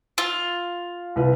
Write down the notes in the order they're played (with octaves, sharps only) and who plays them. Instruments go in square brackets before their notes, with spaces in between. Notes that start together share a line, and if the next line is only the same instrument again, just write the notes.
[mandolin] F4
[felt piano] C2 B4